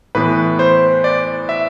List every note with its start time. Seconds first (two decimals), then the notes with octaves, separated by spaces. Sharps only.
0.15 A2 E3 B3 B4
0.59 C5
1.04 D5
1.49 E5